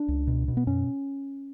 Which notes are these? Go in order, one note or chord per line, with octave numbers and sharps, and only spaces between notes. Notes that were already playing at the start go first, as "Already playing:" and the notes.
Already playing: D4
C#2
B2
B2
B3
F#2 C#4